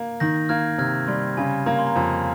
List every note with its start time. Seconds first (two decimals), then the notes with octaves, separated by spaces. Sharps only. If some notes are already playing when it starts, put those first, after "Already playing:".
Already playing: A#3
0.20 D#3 G6 A#6
0.49 A#3 F6 G#6
0.78 C3 F6 G#6
1.08 G3 C6
1.37 C#3 G#5
1.66 A#3 A#5
1.79 C6
1.87 A#5
1.96 F2 G#5